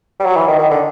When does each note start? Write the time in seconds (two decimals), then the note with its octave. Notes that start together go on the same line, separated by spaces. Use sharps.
0.20 G3
0.25 F#3
0.36 E3
0.48 D#3
0.59 D#3
0.70 D3